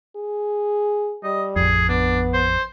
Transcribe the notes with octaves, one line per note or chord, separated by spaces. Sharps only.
G#4
G3 D#5
A1 F2 G#4
B3 D4
C5